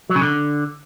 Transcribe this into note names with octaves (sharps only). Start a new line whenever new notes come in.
F#3
C#3
D3